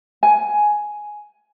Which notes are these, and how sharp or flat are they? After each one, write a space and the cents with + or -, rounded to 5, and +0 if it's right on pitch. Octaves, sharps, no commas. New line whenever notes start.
G#5 +10